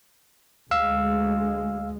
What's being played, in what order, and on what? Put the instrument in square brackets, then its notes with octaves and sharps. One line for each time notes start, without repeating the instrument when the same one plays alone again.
[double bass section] D2 G#3 [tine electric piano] F5 E6